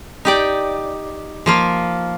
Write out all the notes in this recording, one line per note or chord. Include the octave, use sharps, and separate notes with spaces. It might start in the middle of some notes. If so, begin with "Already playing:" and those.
D#4 G4 D5
F3 A#3 F4